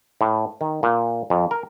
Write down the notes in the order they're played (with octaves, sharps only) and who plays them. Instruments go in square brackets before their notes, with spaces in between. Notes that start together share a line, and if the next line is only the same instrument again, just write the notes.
[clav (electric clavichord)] A2
D#3
A#2
F2
A#4